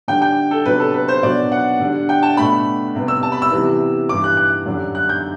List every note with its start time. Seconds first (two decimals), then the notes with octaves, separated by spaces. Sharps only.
0.08 D3 G3 D4 G5
0.22 G5
0.51 A4
0.66 C3 F#3 B3 D4 B4
0.80 A4
0.94 B4
1.08 C5
1.23 B2 F#3 B3 D4 D5
1.52 F#5
1.80 D3 G3 D4
2.09 G5
2.23 A5
2.37 B2 A3 D4 B5
2.95 C3 G3 B3
3.08 E6
3.23 A5
3.32 B5
3.42 E6
3.52 C3 E3 G3 B3
4.09 G2 E3 G3 D6
4.24 F#6
4.37 F#6
4.66 F#2 D3 G3 D4
4.95 F#6
5.09 G6